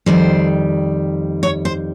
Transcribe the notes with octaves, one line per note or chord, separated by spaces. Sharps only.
F2 D#3 G3 C5
C#5
C5